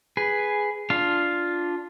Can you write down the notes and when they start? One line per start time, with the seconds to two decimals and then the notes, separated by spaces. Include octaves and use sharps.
0.17 G#4 B4
0.90 D4 F4 F5